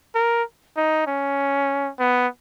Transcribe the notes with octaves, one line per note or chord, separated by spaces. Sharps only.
A#4
D#4
C#4
B3